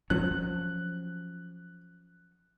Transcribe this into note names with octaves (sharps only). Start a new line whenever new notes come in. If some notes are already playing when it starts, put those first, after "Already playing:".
F3 F#3 C#4 F#6